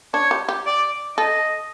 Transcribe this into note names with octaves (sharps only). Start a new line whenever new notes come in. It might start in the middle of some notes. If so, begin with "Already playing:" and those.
D4 C#5
G4
G4
D5
A4 D#5